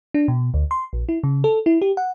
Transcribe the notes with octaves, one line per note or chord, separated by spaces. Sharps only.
D4
B2
D2
C6
A#1
E4
C#3
A4
E4
G4
F#5